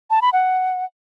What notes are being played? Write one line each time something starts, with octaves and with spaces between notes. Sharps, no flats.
A5
B5
F#5